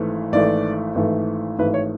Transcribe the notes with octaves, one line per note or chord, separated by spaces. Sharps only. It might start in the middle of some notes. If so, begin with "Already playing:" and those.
Already playing: G#1 G#2 E3 A3
G#1 G#2 E3 A3 D5
G#1 G#2 E3 A3
G#1 G#2 E3 A3 B4
C#5